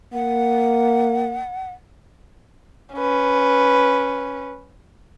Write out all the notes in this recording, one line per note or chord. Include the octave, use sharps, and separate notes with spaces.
A#3 F#5
C#4 B4